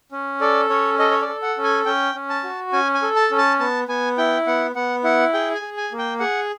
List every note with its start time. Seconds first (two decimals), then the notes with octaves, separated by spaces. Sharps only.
0.12 C#4
0.41 A4 D5
0.70 C#4 C#5
0.99 A4 D#5
1.11 C#5
1.21 D5
1.28 A4
1.42 F#5
1.58 C#4
1.64 G#5
1.85 C#4 G5
2.15 C#4
2.30 A5
2.44 F#4
2.73 C#4 G#5
2.94 G#5
3.02 A4
3.16 A5
3.31 C#4
3.38 A5
3.60 B3 A5
3.88 B3 G#5
4.18 E4 G5
4.47 B3 F#5
4.75 B3 F#5
5.04 E4 F#5
5.33 G#4 G5
5.55 G#5
5.62 G#4
5.77 G#5
5.92 A#3
5.98 G5
6.20 G#4 F#5